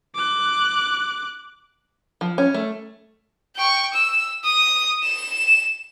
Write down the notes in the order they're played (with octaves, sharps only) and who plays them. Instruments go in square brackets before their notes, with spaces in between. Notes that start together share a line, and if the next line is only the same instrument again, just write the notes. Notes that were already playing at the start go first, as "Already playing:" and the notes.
[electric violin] D6 F#6
[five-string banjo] F3
C#4
A3
[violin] G5 C#6
E6
D#6
E7